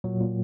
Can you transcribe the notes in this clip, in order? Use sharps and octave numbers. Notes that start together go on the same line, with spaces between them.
A#2 F#3
A#2